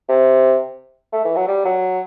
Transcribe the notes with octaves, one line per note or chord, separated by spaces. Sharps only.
C3
A3
E3
F#3
G3
F#3